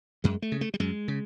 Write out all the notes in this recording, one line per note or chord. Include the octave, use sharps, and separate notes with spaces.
F#2 G#3
A3
C#3
A3
G3
F#2 G#3
C#3